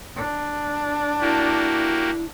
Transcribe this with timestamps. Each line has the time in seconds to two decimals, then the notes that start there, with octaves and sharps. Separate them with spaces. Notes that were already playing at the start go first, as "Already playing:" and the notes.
0.16 D4
1.21 A#3 E4 F#4 G4